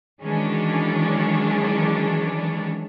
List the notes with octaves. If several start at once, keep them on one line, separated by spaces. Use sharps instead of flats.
D#3 E3 F#3 G#3 C#4 D4